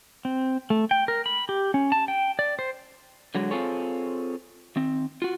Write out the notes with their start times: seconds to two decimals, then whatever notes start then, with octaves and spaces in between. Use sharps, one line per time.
0.25 C4
0.70 A3
0.91 G5
1.08 A#4
1.26 B5
1.49 G4
1.74 C#4
1.92 A5
2.08 G5
2.39 D5
2.59 C5
3.35 D3 F#3 G#3
3.51 C4 F4 G#4 A4 C#5
4.76 D#3 C4
5.22 F4 F#4